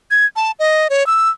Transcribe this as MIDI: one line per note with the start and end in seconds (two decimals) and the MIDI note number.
0.11 0.26 92
0.36 0.51 81
0.59 0.88 75
0.90 1.06 73
1.07 1.29 88